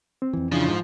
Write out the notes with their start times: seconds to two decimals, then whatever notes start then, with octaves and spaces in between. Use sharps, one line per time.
0.22 C4
0.33 F2 E3
0.52 C#3 F3 D4 E4
0.68 G#2